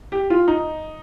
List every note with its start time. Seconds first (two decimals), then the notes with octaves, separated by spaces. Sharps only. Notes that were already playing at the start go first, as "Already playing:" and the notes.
0.12 G4
0.30 F4
0.48 D#4